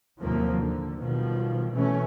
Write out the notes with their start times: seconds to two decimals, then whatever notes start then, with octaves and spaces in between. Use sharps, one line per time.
0.21 D#2 A2 C3 F3 F#3 A#3
0.58 D3
0.98 B1 B2 D#3 F3 G3
1.72 B2 E3 A3 C#4